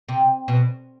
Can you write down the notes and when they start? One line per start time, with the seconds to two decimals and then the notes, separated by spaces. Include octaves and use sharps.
0.08 C3
0.48 B2